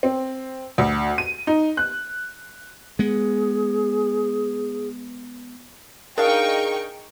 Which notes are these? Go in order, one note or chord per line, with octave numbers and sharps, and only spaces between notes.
C4
D2
D#7
D#4
F#6
G#3 B3 G#4
D4 D#4 G#4 A#4 F5 G5 C#6